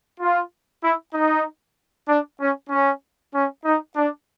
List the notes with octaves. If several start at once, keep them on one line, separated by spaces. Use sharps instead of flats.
F4
E4
D#4
D4
C#4
C#4
C#4
D#4
D4